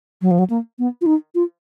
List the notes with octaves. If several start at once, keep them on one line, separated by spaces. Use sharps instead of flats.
F#3
F3
F#3
A#3
B3
F4
D#4
F4